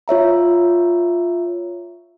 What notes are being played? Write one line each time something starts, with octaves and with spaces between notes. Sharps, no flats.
F4 C#5 E5 A#5